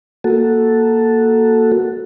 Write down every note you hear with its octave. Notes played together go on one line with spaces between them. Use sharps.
A#3 F#4 A4